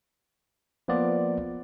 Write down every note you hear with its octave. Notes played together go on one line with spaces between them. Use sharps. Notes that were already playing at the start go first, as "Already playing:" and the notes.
F3 A#3 B3 F4 D5